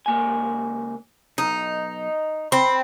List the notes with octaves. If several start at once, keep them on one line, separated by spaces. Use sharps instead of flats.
C#2 A#3 G#5
B1 D#4
C4 B5